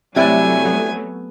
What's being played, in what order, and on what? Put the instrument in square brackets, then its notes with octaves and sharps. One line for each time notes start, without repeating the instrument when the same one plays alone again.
[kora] C3 D5 F#5 [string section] F#3 A3 [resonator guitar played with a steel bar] G3 E4 [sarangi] G#5
[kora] B3